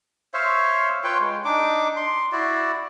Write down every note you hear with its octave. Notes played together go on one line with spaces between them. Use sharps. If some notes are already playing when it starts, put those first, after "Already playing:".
C5 C#5 E5 F5
F4 B4 C#5 G5
G#3
D4 D#4 D6
C6
E4 F#4 D5